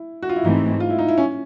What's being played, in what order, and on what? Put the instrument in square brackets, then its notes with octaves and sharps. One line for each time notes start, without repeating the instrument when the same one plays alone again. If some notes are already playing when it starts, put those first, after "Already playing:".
Already playing: [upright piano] E4
F#4
F4
E4
[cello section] G#2 E3 A3 C4 [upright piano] D#4
[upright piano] F4
E4
D#4
E4
C#4